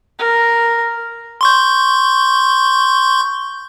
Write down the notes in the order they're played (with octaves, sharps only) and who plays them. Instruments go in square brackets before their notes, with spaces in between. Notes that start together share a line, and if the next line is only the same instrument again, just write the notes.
[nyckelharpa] A#4
[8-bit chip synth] C6 C#6 G6